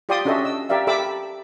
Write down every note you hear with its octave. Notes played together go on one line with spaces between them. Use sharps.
F4 G4 D5 G5 C6 D#6
C#4 D4 F#4 A4 D#5 E5
D#5 E6
G4 A#4 D5 E5 F5
G4 A4 E5 B5 D6 E6